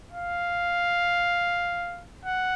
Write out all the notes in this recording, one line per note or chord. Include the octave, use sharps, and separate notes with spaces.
F5
F#5